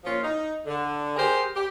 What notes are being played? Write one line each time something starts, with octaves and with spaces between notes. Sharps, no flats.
A#2 F3 C#4 F4
D#4
D3
G4 G#4 A#4 C5
G4